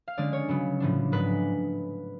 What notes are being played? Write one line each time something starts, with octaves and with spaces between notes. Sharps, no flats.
F5
D3 G#3 C#4 D5
C#5
C#3 F#3 B3
A2 F3 B3 D4
G#2 G#3 B3 D4 B4